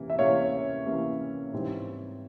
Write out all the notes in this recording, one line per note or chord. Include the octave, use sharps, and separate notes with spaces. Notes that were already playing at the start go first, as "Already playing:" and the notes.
Already playing: C3 E3 A#3 C#4
E5
C3 E3 A#3 C#4 C#5 F5
C3 E3 A#3 C#4
G#2 E3 G3 C4